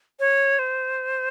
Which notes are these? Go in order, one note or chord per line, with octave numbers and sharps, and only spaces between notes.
C#5
C5